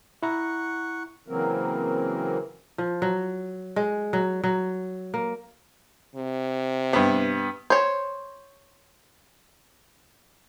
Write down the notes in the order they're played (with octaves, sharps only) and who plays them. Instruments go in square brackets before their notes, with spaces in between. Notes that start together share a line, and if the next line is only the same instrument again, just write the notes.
[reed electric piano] E4 A#5 [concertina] F#5 C#6
[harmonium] C#3 E3 F#3 A#3 C4 A#4
[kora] F3
F#3
G#3
F#3
F#3
A#3
[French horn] C3
[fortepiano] G2 B3
[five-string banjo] C5 C#5